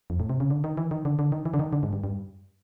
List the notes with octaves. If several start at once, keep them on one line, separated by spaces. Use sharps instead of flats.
F2
A2
C3
C#3
D3
D#3
E3
D#3
D3
D3
D#3
E3
D3
D#3
D3
G#2
G2
G2